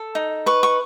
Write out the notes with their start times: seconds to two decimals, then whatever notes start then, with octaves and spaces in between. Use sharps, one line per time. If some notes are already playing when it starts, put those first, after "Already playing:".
Already playing: A4
0.15 D#4
0.46 B4 C#6
0.63 C#6